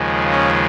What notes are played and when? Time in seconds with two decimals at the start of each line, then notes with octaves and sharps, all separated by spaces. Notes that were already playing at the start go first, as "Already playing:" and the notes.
Already playing: D#2 C#3 F3 G#3
0.31 C#4